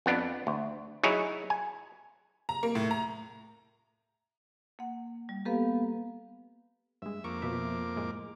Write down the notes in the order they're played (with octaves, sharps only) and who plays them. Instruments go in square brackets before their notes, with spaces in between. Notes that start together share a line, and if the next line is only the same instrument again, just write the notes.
[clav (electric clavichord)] F2 B3 D4
D2
F#3 D#4 E4 G#4 C#5
G#5
[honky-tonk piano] A#5
A#3
A2
A#5
[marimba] A#3 F#5
G3
[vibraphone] A#3 B3 F5 [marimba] G4 A4 B4
[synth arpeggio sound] G2 G#3 [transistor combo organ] E5
[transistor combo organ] F2 A#3 D6 [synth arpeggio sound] C#6
[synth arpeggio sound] B2 F3 E5
A2 G#3